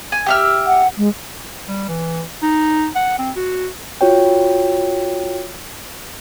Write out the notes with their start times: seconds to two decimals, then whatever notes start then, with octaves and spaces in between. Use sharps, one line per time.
0.12 G#5
0.26 G4 E5 F6
0.67 F#5
0.98 G#3
1.68 G3
1.88 E3
2.43 D#4
2.96 F#5
3.19 C4
3.36 F#4
4.01 F4 F#4 C#5 G5